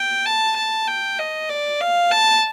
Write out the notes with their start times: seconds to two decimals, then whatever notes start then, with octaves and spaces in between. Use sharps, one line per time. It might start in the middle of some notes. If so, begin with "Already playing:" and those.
Already playing: G5
0.26 A5
0.56 A5
0.88 G5
1.19 D#5
1.50 D5
1.81 F5
2.11 A5